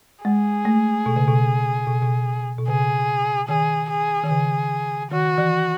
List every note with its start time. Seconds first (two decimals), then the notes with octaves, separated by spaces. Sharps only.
0.25 G#3 G#4
0.65 A3
1.06 B2
1.16 C#3
1.28 B2
1.87 B2
2.03 B2
2.58 B2
2.68 C#3 G#4
3.48 D#3 G#4
3.89 G#4
4.24 D#3
4.30 C#3 G#4
5.11 D#3 F#4
5.38 E3